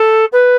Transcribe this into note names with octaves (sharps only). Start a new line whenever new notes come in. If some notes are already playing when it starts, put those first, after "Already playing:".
Already playing: A4
B4